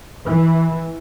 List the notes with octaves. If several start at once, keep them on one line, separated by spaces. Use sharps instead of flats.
E3